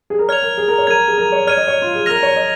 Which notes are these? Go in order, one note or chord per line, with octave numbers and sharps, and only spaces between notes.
G#4
A#4
C#5 F6 G#6 F7
A#4
G#4
A#4
C#5
A#4 G#6 D#7
G#4
A#4
C#5
C#5 F6 G#6 D#7
D#5
C#5
F4
G#4
A#4 F6 A#6 F7
C#5
D#5